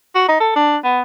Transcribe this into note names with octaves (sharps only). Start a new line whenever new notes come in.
F#4
D#4
A4
D4
B3